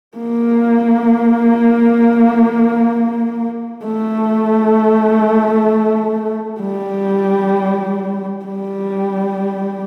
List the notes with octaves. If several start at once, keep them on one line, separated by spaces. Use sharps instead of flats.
A#3
A3
G3
G3